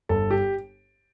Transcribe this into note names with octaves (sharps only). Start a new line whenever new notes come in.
G1 A4
G4